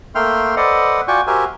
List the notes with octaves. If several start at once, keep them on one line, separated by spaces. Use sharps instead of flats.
A3 A#3 E5 G5 C6 F6
A4 B4 C5 D5 D#5 F#5
F4 F#4 D5 G5 G#5 C#6
F#4 G4 A#4 C5 E5 G#5